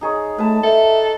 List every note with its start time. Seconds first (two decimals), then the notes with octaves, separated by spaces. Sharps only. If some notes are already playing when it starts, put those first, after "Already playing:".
0.01 D#4 G#4 C#5
0.38 A3 B4 A5
0.63 A4 E5 G5